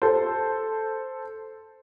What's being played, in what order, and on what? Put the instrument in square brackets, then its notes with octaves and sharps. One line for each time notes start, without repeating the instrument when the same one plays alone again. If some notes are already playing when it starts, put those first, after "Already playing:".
[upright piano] A4 C5